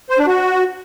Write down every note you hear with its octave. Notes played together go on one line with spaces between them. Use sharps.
C5
D4
F#4